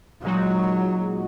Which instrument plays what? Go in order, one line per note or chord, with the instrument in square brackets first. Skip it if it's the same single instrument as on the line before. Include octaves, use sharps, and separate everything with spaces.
[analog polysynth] A#2 G#3 D#4 F#4 [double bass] F#3